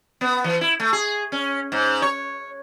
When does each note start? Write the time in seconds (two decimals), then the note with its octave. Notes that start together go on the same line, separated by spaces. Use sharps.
0.21 B3
0.44 E3
0.61 E4
0.80 A3
0.93 G#4
1.32 C#4
1.72 G#2
2.02 C#5